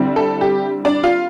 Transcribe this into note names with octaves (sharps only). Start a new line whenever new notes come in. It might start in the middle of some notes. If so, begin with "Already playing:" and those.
Already playing: D3 G3 C4 E4
A4
G4
D4 D5
F4 F5